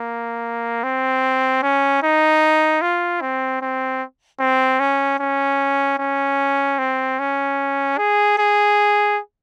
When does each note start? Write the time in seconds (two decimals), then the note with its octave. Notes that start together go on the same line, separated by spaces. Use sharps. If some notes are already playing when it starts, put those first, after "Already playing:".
Already playing: A#3
0.83 C4
1.63 C#4
2.03 D#4
2.82 F4
3.21 C4
3.62 C4
4.40 C4
4.80 C#4
5.19 C#4
5.99 C#4
6.79 C4
7.19 C#4
7.98 G#4
8.38 G#4